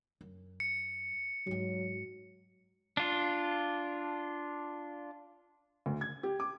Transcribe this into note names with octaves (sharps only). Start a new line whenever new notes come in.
F#2
C#7
G#2 F#3 G#3
D4 F4
D2
G#6
G4
D6